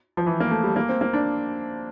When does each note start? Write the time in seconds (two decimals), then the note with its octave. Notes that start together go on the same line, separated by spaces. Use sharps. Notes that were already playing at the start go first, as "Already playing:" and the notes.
0.17 F3
0.26 E3
0.40 A#3
0.51 A3
0.64 G3
0.76 A#3
0.89 C4
1.01 A#3
1.13 D4